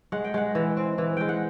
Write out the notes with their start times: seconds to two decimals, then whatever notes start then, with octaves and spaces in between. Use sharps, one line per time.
0.12 G#3 F#5
0.24 G5
0.34 G#3 F#5
0.55 E3
0.77 C4
0.98 E3
1.17 G#3 G5
1.29 F#5